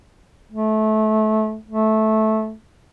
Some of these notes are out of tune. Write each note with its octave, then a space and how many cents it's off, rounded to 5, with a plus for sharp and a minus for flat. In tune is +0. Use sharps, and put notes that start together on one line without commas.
A3 -25
A3 -10